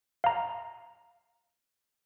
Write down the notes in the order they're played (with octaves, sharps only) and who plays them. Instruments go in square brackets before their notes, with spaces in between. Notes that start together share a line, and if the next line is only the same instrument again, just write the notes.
[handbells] F5 A#5